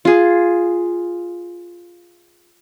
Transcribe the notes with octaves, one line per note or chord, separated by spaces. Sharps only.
F4 G#4